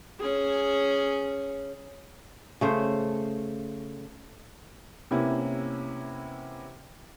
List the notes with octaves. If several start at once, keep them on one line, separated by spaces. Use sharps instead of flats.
C#4 G#4
C#3 A3 C5
C3 A#3 B3 C#4 E4